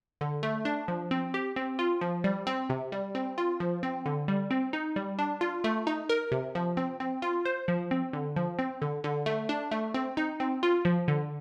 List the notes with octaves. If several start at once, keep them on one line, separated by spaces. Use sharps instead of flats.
D3
A3
D4
F3
C4
G4
C4
F4
F3
G3
C4
C3
G3
C4
F4
F3
C4
D3
G3
C4
D#4
G3
D4
F4
A3
D#4
A#4
C3
F3
C4
C4
F4
C5
F3
C4
D3
F3
C4
D3
D3
A3
D4
A3
C4
D#4
C4
F4
F3
D3